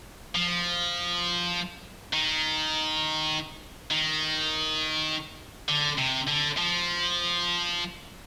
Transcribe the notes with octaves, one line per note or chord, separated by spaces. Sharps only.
F3
D#3
D#3
D3
C3
D3
F3